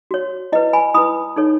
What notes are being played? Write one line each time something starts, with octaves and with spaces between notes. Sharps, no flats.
F#4 C#5
E4 B4 D#5
G#5 B5
E4 B4 B5 D#6
D#4 A4 C#5